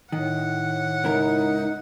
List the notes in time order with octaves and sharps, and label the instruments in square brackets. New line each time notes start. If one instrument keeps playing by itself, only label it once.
[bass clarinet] A2 [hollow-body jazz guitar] D#3 [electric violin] F#5
[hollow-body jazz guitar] C#2 E4 A#4 [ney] D#4